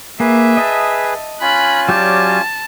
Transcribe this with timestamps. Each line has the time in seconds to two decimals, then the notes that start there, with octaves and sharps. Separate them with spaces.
0.20 A#3 G#4 B4 E5
0.57 D#5 A5
1.42 C#4 F4 G#5 B5 F#6
1.89 F#3 G4 D5 A5